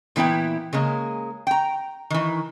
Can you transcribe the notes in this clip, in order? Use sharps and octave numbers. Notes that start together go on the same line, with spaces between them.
A#2 E3 B3 E4 G5
C#3 G#3 A#3
G5 A#5
D#3 E3